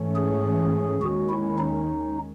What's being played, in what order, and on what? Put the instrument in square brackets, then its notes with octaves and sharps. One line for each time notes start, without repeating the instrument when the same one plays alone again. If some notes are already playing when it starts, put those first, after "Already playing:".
Already playing: [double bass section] G#2 E3 A3 C#4
[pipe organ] G#4
[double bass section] D#2 D#3 G#3 C#4 [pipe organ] F#4
[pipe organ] E4
D#4